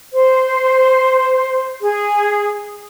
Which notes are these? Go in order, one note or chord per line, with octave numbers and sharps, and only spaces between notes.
C5
G#4